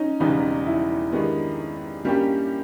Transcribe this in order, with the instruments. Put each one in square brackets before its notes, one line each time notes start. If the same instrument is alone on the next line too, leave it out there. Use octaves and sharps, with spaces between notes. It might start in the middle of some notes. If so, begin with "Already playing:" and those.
Already playing: [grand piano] C#4 D#4
[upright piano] E1 E2 C#3 G3 B3 [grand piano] D#4
[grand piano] E4
[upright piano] G2 D#3 G#3 B3
G2 G3 A#3 C#4 G4